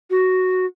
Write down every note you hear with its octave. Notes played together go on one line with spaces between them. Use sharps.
F#4